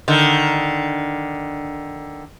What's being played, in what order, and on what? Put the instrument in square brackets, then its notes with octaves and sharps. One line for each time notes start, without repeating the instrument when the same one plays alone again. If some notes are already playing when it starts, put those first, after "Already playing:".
[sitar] D3 D#3